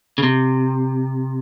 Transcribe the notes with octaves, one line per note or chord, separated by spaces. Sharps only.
C#3
C3